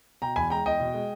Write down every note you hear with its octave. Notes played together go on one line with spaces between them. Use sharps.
B2 G5 A#5
E2 G#5 B5
G#3 G5 A#5
E2 D#5 G5
B2
G#3